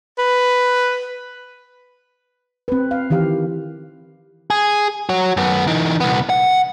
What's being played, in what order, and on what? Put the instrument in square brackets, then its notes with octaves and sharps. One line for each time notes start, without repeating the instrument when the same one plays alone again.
[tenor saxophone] B4
[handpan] C4 B4
F5
D#3 E3 G4 F5
[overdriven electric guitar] G#4
F#4 C#5
F#2 B3
E3 D#4
C2 B3
F#5